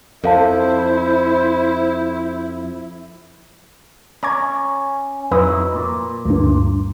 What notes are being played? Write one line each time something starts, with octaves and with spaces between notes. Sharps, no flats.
F2 E4 A4 C5 F5 A5
C#4 A#5 D6 G#6
F2 F#3 D#4 E4 B4 D#6
A#2
D2 G2